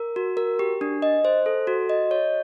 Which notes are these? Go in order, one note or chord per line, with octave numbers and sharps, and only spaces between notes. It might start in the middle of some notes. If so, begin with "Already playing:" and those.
Already playing: A#4
F#4
A#4
G4
D4
D#5
C5
A4
F#4
D#5
C#5